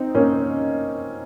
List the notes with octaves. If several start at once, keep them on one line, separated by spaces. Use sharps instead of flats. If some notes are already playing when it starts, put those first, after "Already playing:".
Already playing: C4 D#4
A#3 C#4